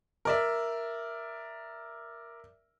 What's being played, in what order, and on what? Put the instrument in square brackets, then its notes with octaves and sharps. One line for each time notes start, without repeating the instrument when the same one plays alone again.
[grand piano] A#4 D5 E5